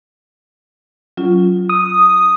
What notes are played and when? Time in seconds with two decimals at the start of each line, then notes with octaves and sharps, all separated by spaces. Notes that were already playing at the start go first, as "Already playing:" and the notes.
1.17 F#3 C#4 F4
1.69 D#6